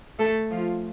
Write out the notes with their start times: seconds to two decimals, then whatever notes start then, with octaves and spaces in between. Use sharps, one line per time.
0.19 A3 A4
0.50 F3 F4